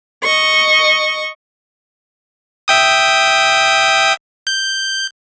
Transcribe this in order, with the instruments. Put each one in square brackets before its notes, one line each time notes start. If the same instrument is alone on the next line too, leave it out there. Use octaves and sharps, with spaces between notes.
[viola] D#5 C#6
[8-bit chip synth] E5 G5 D#6
G6